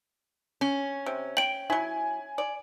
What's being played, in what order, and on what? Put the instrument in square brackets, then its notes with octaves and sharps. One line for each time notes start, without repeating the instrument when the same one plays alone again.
[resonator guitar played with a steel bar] C#4
[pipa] C3
[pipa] G5 [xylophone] D7 F#7
[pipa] F#3 E4 [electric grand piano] G#5
[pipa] D5